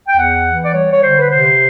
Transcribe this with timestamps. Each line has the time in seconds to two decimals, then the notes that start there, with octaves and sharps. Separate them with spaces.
0.08 G5
0.17 E2 F#5
0.45 E3
0.64 D5
0.73 G3 C#5
0.91 C#5
1.02 D3 C5
1.19 B4
1.30 C3 C5